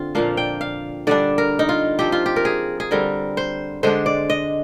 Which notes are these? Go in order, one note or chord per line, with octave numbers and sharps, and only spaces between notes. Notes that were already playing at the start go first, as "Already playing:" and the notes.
Already playing: D3 C4 F4
A#2 F3 A#3 D4 F5
G5
F5
D3 G3 D4 D5
A#4
D#4
F4
F3 C4 G4
F4
G4
A#4
G#4
G#4
D3 G3 C4 A#4
C5
D3 G#3 D4 C5
D5
D#5